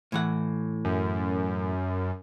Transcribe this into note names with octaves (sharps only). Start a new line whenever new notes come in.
A2 E3 F#5
F#2